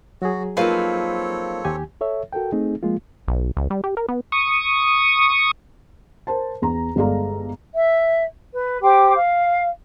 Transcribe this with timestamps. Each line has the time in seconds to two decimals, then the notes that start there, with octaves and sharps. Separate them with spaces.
0.22 F#3 F#4 G#4
0.57 F3 A#3 C4 D#4 A4 B4 C#5 F5
1.65 D#2 G4 G#5
2.01 A4 C#5 E5
2.33 F#4 A4 A#4 G5
2.52 A3 C4 D#4 G#4
2.83 F3 G#3 A#3 F4
3.28 B1
3.57 C#2
3.70 G3
3.84 G4
3.97 A#4
4.09 B3
4.32 C#6 D#6
6.27 A#4 C5 A5
6.62 E2 A#5
6.96 G1 G#3 A4 D5 F5 A#5
7.75 E5
8.52 B4
8.81 G4 C5 G5 D6
9.15 F5